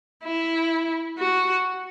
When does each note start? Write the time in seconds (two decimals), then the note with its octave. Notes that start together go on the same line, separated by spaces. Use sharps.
0.24 E4
1.19 F#4